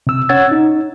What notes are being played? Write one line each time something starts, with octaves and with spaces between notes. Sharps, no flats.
C3 E6
C#4 C#5 F#5 E6 G#6 A6
D#4